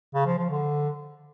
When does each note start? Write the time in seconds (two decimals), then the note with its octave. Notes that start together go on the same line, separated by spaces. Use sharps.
0.14 C#3
0.26 F3
0.38 F3
0.50 D3